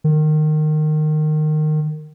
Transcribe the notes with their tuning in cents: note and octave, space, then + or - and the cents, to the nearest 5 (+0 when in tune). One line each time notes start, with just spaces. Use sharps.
D#3 -20